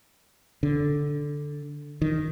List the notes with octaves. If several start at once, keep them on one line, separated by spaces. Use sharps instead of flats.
D3
D#3